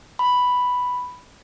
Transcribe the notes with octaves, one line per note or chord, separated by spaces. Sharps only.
B5